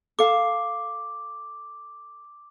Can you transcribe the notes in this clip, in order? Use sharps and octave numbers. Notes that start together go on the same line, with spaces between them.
A4 F5 D6